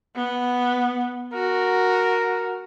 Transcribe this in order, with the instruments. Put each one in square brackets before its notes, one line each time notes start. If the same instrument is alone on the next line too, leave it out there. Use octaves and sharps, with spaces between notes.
[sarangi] B3
[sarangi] F#4 [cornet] A#4